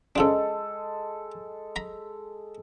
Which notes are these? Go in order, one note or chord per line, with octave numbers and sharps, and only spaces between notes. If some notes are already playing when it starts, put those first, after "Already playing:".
C#3 F3 G#3 D4 A4
A#5 B5